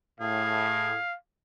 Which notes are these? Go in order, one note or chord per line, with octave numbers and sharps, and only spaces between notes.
A2 G#4 F5